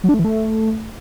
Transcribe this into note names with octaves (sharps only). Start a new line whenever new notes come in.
F#3
D4
A3
E3
A3